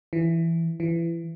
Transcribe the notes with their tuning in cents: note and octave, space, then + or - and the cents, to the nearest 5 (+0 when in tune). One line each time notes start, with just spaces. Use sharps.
E3 +10
E3 +25